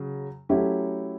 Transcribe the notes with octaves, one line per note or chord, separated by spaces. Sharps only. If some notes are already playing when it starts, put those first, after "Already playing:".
Already playing: C#3 F#3
F#3 A3 C#4 E4 G4